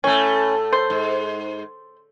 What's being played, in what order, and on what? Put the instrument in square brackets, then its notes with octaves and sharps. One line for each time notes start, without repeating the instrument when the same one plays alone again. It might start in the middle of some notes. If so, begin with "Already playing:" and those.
[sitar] A2 A3 [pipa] C#4
[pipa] C5
[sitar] G#2